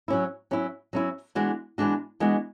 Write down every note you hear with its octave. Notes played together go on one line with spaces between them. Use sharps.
F#3 C#4 E4
F#3 C#4 E4
F#3 C#4 E4
E3 G#3 B3 D4 F#4
E3 G#3 B3 D4 F#4
E3 G#3 B3 D4 F#4